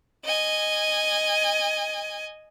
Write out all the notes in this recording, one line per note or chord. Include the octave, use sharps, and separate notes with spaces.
D#5 G#5